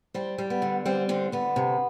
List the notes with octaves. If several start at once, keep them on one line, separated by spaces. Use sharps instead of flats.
G3 C4
G3
B3
D3
G3 C4
D3 C4
D3 B3
C3